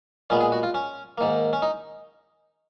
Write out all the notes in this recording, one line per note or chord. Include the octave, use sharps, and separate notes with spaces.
A#2 G#3 B3 C#4
G#4
F#4
F4
C#4
G#2 D#3 A#3
C#4
D#4